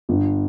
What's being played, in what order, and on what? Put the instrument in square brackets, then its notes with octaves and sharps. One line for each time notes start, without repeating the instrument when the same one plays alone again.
[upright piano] G1